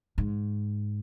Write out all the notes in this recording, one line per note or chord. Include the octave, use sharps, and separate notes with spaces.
G#2